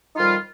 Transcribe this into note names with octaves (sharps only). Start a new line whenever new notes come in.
D#4
F2 D#3 G3 F4